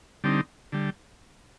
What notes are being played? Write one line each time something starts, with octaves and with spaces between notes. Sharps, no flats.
D3 G3 C4 D#4
D3 G3